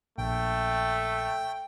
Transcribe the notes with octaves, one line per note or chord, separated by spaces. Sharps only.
A#1 A3 G5